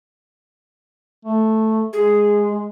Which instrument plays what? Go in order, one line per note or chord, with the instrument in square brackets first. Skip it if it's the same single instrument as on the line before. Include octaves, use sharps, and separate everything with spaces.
[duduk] A3
[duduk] G#3 [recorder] G#4